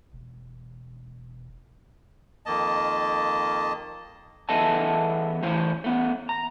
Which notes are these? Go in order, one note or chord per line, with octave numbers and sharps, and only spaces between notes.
E1
F2 D#3 A#3 D#5 A5
E2 B3 A4 D#5 E5 A5
A2 E3 C5
A3 B3
A#5